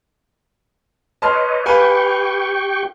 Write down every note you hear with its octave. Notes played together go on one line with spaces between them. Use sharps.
B4 C#5 D#5 A5 C6 F6
G4 B4 F5 G5 G#5 C#6